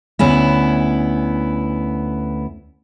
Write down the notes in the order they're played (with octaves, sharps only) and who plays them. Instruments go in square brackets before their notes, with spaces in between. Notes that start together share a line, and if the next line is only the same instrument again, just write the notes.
[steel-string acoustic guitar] D2 B3 C#4 E4